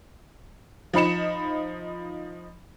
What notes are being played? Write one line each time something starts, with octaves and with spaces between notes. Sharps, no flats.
F3 D#4 B5 C#7 E7